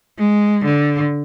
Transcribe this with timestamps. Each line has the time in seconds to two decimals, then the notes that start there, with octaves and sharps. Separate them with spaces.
0.19 G#3
0.65 D3